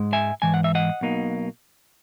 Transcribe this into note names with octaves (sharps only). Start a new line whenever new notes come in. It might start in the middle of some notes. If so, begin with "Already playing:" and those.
Already playing: G#2 G#3
E5 G#5
G#2 E3 G#5
F#5
E5
D#5 F#5
B1 B2 A#3 D#4